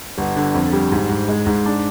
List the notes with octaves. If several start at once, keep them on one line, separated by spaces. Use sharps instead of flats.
G1
D3
F2
G3
G#2
G#2
G#3
G#2
D4